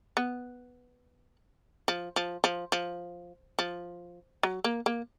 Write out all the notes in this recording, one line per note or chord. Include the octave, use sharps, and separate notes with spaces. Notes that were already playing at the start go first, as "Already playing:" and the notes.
B3
F3
F3
F3
F3
F3
F#3
A#3
A#3